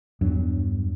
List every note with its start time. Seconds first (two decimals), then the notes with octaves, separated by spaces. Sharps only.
0.21 E2 G2 F#3 D4